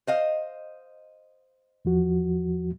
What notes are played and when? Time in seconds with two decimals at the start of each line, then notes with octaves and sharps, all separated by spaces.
0.07 C5 D#5 F5
1.85 E2 F3 F#4